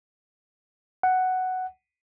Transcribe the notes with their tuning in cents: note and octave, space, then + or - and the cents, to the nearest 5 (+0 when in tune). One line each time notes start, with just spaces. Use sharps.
F#5 +5